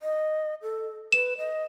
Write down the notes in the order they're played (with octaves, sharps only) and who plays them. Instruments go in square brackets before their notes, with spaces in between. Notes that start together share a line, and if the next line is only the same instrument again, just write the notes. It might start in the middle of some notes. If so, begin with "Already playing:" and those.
[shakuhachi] D#5
A4
[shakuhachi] B4 [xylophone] E7
[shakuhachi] D#5